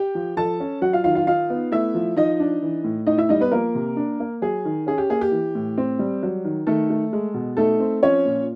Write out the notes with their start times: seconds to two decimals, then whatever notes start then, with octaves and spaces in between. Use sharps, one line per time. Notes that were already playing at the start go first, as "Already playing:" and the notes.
Already playing: G4 G5
0.15 F3
0.37 F3 A4 A5
0.60 C#4
0.81 F#3 F#4 F#5
0.93 F4 F5
1.04 D#3 F4 F5
1.15 F4 F5
1.27 D#4 F4 F5
1.50 B3
1.72 A3 E4 E5
1.94 F3
2.16 F3 D#4 D#5
2.40 D4
2.62 E3
2.84 A2
3.07 A2 D#4 D#5
3.18 E4 E5
3.29 G3 D#4 D#5
3.41 B3 B4
3.52 F3 A#3 A#4
3.75 C3
3.97 D4
4.20 A#3
4.42 F#3 G#4
4.65 D#3
4.87 C#4 G#4
4.98 G4
5.10 A#3 G#4
5.21 G4
5.32 E3
5.55 A2
5.78 C4
5.99 G3
6.23 F#3
6.45 D#3
6.67 D#3 A3 A4
6.90 A3
7.13 G#3
7.34 B2
7.57 A3 D#4 A4
7.80 C4
8.03 F3 C#4 C#5
8.25 A#2